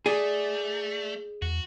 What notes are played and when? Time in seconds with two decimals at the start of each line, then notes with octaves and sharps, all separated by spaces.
0.06 A3 G#4 D5
1.42 E2 F#4